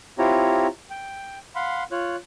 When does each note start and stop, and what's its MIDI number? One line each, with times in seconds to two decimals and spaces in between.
0.18 0.67 60
0.18 0.67 64
0.18 0.67 65
0.18 0.67 67
0.18 0.67 73
0.18 0.67 82
0.90 1.39 79
1.55 1.83 77
1.55 1.83 78
1.55 1.83 83
1.55 1.83 84
1.91 2.16 65
1.91 2.16 73
1.91 2.16 90